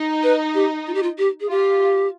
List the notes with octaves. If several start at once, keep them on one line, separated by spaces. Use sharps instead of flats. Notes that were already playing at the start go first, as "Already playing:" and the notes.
Already playing: D#4
B4
G4
F4
G4
F4
G4
G#4
F4 G4